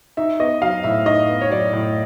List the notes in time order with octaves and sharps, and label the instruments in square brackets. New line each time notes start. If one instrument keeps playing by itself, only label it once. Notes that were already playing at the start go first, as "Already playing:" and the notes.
[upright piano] D#4 E5
B3 D#5
F#3 F5
A2 E5
D#4 D#5
B3
C#5
F#3 D5
A2